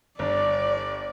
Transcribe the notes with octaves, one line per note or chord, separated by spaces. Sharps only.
G1 D4 D5